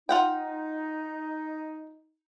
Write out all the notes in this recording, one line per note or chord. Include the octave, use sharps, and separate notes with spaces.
D#4 F4 F#5 G5